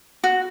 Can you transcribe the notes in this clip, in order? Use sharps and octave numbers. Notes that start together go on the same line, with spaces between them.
F#4